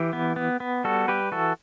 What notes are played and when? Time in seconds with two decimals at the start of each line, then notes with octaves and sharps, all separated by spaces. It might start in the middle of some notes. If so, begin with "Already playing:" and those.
Already playing: E3 G4
0.13 B3
0.36 B3
0.60 B3
0.84 G3 F#4 A4
1.08 G3 G4 B4
1.32 E3 F#4 A4